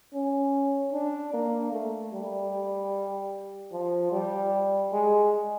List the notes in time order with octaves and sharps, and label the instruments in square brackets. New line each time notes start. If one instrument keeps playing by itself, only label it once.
[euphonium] C#4
D4
A#3
A3
G3
F3
G3
G#3